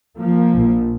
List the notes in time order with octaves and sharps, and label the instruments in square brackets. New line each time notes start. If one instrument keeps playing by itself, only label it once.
[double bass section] F3 A#3
A#1 A#2